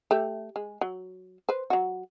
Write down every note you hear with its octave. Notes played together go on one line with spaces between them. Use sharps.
A3 G4 E5
G#3
F#3
B4 C5
F#3 F#4